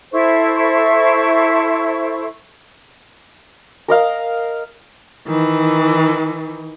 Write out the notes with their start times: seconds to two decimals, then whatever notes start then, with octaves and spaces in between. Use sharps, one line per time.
0.13 E4 A4 C5 C#6
3.88 A#4 D#5 F5
5.28 D#3 E3